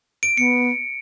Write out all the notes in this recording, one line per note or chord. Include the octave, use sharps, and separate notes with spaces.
D7
B3 C#7